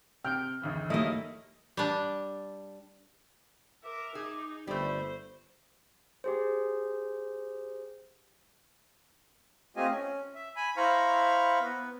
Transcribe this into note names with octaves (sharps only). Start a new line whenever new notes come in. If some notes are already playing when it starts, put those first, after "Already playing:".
C3 G5 F6
G#1 D2 E3
D#3 F#3 G3 A3 A#3 E4 D#5
G3 D4
A#4 E5 D6
D#4 G#4
G1 G3 A3 C5 B5
G4 G#4 C5
A3 C4 F4 G4 D#5 G#5
C#4
E5
G#5 B5
E4 C5 F5 A#5 B5 C#6
B3